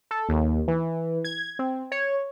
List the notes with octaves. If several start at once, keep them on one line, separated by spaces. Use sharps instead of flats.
A4
D#2
E3
G#6
C4
C#5